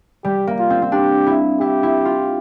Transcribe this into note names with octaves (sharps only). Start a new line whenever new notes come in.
G3 G4
A#3
F4
C4
C4
D4 G4
E4
E4 G4
E4
F4